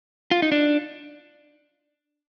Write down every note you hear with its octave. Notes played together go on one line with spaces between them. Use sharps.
F4
D#4
D4